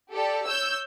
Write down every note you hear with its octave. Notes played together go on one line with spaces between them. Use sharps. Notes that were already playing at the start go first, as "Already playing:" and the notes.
G4 A4 D5
C#5 E6 G6